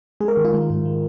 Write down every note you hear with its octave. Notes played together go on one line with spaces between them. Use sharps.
G#3 G#4
A#4
D#3
F4
G#3
G#2
G#3